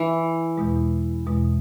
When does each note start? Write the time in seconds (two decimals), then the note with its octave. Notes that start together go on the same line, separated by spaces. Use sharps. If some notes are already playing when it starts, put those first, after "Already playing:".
Already playing: E3
0.58 E2 B2 G#3
1.27 E2 B2 G#3